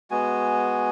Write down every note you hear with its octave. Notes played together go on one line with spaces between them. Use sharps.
G#3 B3 F#4 G#5